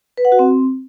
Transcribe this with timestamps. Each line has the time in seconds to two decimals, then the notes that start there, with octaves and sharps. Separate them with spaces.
0.17 B4
0.25 F#5
0.32 F#4
0.39 C4